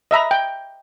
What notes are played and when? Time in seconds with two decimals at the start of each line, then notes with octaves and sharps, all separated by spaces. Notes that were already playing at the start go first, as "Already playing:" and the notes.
0.11 D#5 E5 A#5 B5
0.31 G5